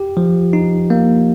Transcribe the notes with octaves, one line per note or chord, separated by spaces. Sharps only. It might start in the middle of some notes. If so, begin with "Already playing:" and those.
Already playing: G4
F3
D#4
A#3